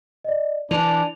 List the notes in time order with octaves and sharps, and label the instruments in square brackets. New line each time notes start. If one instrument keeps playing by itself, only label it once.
[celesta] D5 D#5
[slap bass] E3 [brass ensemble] D4 [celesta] F7